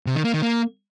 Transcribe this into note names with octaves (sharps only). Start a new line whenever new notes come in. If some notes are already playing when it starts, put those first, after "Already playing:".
C3
D#3
A#3
D#3
A#3